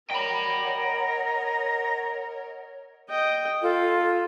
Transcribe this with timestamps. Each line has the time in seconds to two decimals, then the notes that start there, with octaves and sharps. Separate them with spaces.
0.11 A#4 C#5 D#5 F#5 G5 A#5 B5
3.09 D#5 G5
3.62 F4 A4